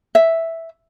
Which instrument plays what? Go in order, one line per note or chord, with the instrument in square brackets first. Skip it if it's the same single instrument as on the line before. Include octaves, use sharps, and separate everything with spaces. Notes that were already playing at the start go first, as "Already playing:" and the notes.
[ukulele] E5